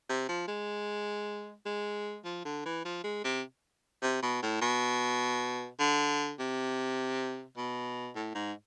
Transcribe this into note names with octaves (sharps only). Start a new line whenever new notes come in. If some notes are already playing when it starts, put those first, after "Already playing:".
C3
F3
G#3
G#3
F3
D3
E3
F3
G#3
C3
C3
B2
A2
B2
D3
C3
B2
A2
G#2